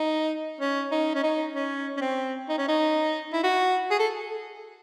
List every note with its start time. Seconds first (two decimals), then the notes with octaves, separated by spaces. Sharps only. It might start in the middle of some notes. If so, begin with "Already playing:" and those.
Already playing: D#4
0.61 C#4
0.91 D#4
1.15 C#4
1.24 D#4
1.55 C#4
1.97 C#4
2.01 C4
2.49 D#4
2.58 C#4
2.68 D#4
3.33 E4
3.44 F#4
3.91 G#4
3.99 A4